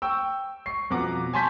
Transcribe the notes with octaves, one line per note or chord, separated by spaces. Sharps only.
G5 C#6 E6
C#6 C7
F2 B2 F#5 A#5 D6
G#5 A5 C6 C#6 G6 B6